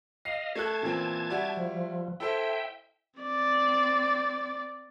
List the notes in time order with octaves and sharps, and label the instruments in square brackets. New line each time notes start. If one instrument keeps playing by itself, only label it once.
[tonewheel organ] D#5 F5 [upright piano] C7
[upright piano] A3 A4 F#6 [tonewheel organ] A5 G#6
[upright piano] A#2 E3 C4
G3 E4 F#4
[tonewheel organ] F3
[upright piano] E4 A4 C5 [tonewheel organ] E5 G5
[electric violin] C4 D5